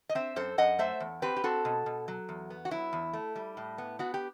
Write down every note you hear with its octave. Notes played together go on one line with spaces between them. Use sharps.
D#5
C4 C5 E5
F#2 A4 C5
F#2 D#5 F#5
A3 C5 E5
E2
C4 G4 B4
G4
C4 F#4 A4
B2
B2
F#3
E2
B3
F#4
F#3 E4
E2
A3
G3
A2
B3
B3 F#4
G4